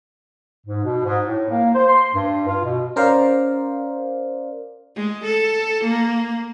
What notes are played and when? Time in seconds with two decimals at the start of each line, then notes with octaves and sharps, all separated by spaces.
0.67 G#2
0.85 B2
1.05 G#2
1.26 A2
1.50 A#3
1.75 C5
1.89 C6
2.15 G2
2.47 F4
2.64 B2
2.96 C#4 A#4 C5 D5 F5
4.96 G#3
5.24 A4
5.84 A#3